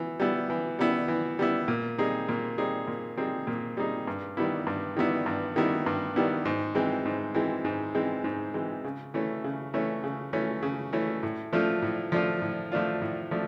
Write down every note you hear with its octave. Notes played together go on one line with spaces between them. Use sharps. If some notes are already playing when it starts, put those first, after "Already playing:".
Already playing: E3 B3
G3 B3 E4
E3
G3 B3 E4
E3
G3 B3 E4
A#2
G3 C4 D#4 G#4
A#2
G3 C4 D#4 G#4
A#2
G3 C4 D#4 G#4
A#2
G3 C4 D#4 G#4
G2
D#3 G3 B3 E4
G2
D#3 G3 B3 E4
G2
D#3 G3 B3 E4
G2
D#3 G3 B3 E4
G#2
E3 G#3 C4
G#2
E3 G#3 C4
G#2
E3 G#3 C4
G#2
E3 G#3 C4
C#3
E3 A3 C#4
C#3
E3 A3 C#4
C#3
E3 A3 C#4
C#3
E3 A3 C#4
A2
F3 A3 D4 F4
A2
F3 A3 D4 F4
A2
F3 A3 D4 F4
A2
F3 A3 D4